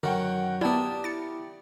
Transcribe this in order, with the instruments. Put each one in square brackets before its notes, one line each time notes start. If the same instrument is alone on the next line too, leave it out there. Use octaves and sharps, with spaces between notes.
[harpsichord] F#2 D#3 F#4 [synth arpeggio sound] D3 [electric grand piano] A#4 F#5 G5
[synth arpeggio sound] B3 E4 [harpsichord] D4 A#4 [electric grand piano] G4 [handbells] D5 A5 D#6
[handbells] E4 [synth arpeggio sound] A6 C#7